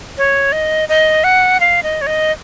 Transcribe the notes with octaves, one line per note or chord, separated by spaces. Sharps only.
C#5
D#5
D#5
F#5
F5
D#5
C#5
D#5